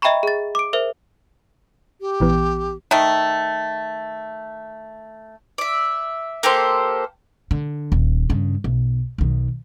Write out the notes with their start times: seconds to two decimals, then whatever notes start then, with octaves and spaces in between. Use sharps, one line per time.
0.02 D#5 E5 G5 A#5 B5 C#6
0.23 G#4 A6
0.55 D6 D7
0.73 A#4 C5 E5
2.01 G4
2.20 A#1 E3 B3
2.91 D#3 A3
5.58 D5 E5
6.43 A#3 G4 A4 C5
7.51 D3
7.92 D#1
8.30 G2 C#3
8.64 B1
9.18 B1 D#3